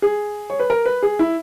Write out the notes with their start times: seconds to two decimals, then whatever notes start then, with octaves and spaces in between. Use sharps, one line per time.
0.02 G#4
0.50 C#5
0.59 B4
0.70 A#4
0.86 B4
1.02 G#4
1.19 E4